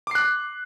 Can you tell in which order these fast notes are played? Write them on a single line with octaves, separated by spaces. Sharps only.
D6 C7 F#6